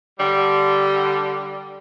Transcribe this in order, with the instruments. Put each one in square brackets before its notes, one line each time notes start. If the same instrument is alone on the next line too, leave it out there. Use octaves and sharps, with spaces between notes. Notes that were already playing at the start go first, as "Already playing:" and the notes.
[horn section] D3 G3